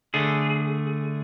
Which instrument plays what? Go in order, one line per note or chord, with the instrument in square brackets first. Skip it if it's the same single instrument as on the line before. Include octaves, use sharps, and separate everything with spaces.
[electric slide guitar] D3 A3 G#4